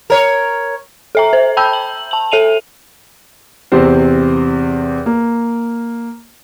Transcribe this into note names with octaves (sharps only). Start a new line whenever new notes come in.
A#4 C#5
A4 E5 A#5
C5
G5 A5 B5 E6 G6
F#7
A5 F#7
A4 E5 D#7 F7
E2 C3 C4 C5
A#3